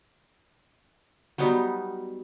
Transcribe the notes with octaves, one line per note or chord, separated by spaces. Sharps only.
F#3 G3 B3 D#4